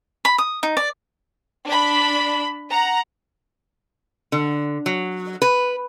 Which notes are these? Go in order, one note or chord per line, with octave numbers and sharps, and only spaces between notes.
B5
D#6
D#4
D5
D4 B5
F#5 A#5
D3
F#3
B4